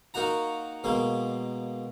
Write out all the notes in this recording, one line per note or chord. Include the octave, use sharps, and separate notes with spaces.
A#3 D#4 F#4 A#5
B2 G#3 A#3